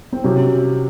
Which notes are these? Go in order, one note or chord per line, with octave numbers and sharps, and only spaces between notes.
C4
C3 F#3 C#4